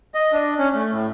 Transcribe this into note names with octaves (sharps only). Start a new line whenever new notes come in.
D#5
D4
C#4
A3
A2